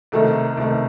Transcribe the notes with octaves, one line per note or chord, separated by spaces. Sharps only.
C2 C3 D#3 A3 D#4 A4
C2 C3 D#3 A3 D#4